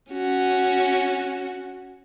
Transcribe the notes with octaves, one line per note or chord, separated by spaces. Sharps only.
C#4 F#4